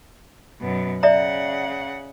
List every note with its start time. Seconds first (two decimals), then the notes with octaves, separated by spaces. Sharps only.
0.61 F#2 B2
1.03 C#3 D5 E5 F#5 A#5